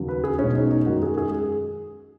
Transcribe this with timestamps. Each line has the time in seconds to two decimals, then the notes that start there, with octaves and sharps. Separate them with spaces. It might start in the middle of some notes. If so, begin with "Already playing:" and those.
Already playing: D#2 C#3 F#3
0.08 B4
0.24 G#4
0.39 B1 B2 G#3 C#4
0.55 D#4
0.71 D#4
0.86 F#2 D#3 G#3 F#4
1.03 G#4
1.18 G#4